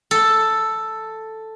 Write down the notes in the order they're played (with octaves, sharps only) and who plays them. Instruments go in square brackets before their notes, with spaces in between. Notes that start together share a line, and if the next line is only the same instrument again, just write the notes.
[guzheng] A4